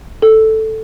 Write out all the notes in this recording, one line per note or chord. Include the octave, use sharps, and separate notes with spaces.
A4